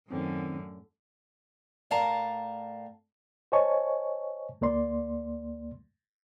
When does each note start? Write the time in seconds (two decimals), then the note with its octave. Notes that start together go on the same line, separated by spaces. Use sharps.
0.10 F#2 A2 D3 D#3 C4 C#4
1.91 A2 A#4 D5 F5 A5 A#5
3.52 C5 C#5 D#5 G#5 A5 C#6
4.61 D2 A#3 D5 C6